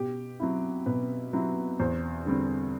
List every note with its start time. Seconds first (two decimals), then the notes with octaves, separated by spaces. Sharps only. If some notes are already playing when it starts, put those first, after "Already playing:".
Already playing: B2 G4
0.40 F#3 C4 E4
0.86 B2 B4
1.33 F#3 C4 E4
1.79 E2 C5
2.26 D3 G3 C4